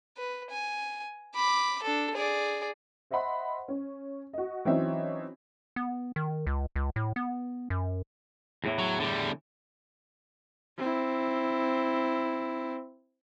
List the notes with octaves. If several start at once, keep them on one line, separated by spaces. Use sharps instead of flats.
B4
G#5
B5 D6
D4 A4
G#4 D5
C5 D#5 E5 F#5 B5 C6
C#4
F#4 D#5
E3 F#3 C4 C#4 D#4 E5
B3
D#3
C#2
C#2
A2
B3
F#2
E2 A2 E3
F#3
D3 G3
C4 E4